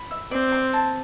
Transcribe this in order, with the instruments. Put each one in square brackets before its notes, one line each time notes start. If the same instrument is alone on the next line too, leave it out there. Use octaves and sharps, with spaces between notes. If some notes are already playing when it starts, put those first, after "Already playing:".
Already playing: [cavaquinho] B5
E5
[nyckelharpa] C4 [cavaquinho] D5
[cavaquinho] C6
A5